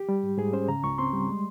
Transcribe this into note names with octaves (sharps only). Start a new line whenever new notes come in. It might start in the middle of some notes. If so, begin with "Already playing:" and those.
Already playing: G4
G3
G#2
G#2 G#4
C#4 C5
C#3 A#5
C#2 C#6
C4 C6
G3
G#3